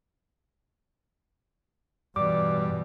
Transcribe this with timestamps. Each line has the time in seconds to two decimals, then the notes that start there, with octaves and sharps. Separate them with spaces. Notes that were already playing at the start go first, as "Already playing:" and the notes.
2.16 G2 B2 E3 D5 D6